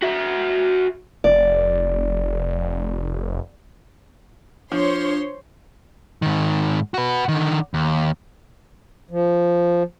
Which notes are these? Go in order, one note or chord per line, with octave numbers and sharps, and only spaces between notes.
F#4 E5
F1 D5
F3 D4 C5 C#5 C6
G#2 D#3
F#4 B4
D3 D#3
D#2
F3